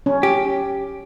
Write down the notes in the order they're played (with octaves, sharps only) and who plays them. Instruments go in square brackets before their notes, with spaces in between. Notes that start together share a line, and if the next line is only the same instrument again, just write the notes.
[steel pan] C#4
[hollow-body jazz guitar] G4